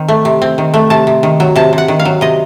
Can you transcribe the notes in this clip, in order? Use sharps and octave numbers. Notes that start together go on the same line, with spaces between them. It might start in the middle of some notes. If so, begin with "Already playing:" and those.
Already playing: D#3 C4
A3
C3
C4
D#3
A3
C3 A5
C3
D#3
F#3
C3 A5
C3
F#5
D#3
F5
F#3
C3 D#5